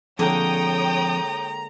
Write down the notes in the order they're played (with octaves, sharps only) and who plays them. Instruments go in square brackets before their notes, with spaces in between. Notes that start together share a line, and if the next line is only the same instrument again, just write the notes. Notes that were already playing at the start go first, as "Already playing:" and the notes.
[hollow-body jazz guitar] F2 [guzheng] D3 G#3 A#3 [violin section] C#5 G5 D#6 [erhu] A#5